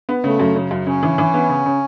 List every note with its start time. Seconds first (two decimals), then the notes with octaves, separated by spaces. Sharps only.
0.09 B3
0.24 C#3 A3
0.40 F#2
0.56 C#3
0.71 F#2
0.87 C#3 C#4
1.03 E3
1.18 E3
1.34 B3
1.49 C#3
1.66 C#3